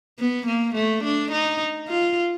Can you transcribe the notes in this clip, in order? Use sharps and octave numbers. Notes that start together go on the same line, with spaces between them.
B3
A#3
A3
D4
D#4
F4